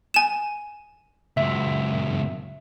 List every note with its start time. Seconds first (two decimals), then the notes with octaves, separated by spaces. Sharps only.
0.14 G#5 E7
1.37 C#2 F#2 E5